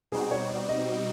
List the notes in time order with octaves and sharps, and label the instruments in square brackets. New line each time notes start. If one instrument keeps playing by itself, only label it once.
[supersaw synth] B2 G3 C4 D#4 F#4 [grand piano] G#4
[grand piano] C#5
D5
D#5